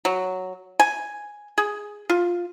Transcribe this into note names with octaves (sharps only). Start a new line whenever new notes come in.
F#3
G#5
G#4
F4